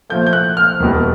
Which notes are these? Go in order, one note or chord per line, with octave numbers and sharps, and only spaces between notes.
A#2 F3 A3 G6
G6
F#6
F6
E1 E2 B2 G3